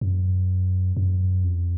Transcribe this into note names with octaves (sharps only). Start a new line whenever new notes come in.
F#2
F#2
F2